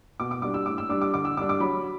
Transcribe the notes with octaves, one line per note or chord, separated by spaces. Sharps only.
B2 D6
D6
G3 D4 D6
E6
A2 D6
E6
G3 D4 D6
D6
D3 D6
E6
G3 D4 D6
D6
F#3 B5